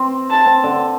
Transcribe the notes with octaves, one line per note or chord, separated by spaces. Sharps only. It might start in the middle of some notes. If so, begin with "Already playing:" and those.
Already playing: C4
A5
C4
D3